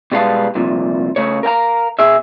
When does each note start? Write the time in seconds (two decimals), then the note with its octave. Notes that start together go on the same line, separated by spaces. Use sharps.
0.12 B2 G3 G#3 B3 F5 A5
0.55 C2 F2 A#2
1.16 C#3 A3 C#5
1.43 A#4 F5 G5 A#5
1.99 B2 G#4 E5